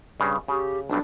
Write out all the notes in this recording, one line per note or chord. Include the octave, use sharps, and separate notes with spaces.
G2 C#3
C#3 G4
B1 G2 D4